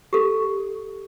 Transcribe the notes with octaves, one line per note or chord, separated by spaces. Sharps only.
G4 A4